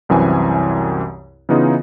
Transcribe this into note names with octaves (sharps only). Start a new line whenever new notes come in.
C2 F#2 E3 C4 G#5
C#3 E3 B3 D#4 F4 G#4